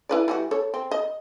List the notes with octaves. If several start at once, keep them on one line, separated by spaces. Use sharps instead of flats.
E4 B4 D5
E3 G3 F#4
A4 C#5
C4
D#5